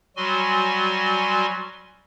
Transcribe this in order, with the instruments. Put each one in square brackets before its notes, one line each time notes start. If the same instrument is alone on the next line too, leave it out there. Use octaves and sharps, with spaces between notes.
[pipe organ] F#3 G3 F#4 G#5 C6